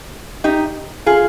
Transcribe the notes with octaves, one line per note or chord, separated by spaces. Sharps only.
D#4 G4
F4 G#4